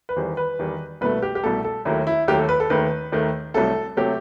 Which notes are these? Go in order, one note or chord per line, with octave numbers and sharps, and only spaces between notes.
B4
E2 D#3 G3 C5
B4
E2 D#3 G3
C2 B2 A3 B4
G4
G4
C2 B2 A3 A4
A4
D#2 D#3 F#3 A3 E4
E4
D#2 D#3 F#3 A3 G4
A4
B4
A4
D#2 D#3 A3 B4
D#2 D#3 A3
C2 C3 F#3 A3 A4
C3 F#3 A3 G4